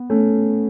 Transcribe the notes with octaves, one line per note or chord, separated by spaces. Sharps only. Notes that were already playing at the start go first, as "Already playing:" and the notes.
Already playing: B3
A3 C#4